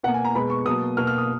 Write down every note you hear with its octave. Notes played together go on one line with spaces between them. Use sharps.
B2 A#3 F#5
G#5
A#5
B2 G#3 B3 B5
C#6
B2 F#3 A#3 D#6
B2 A#3 F6
F6
D#6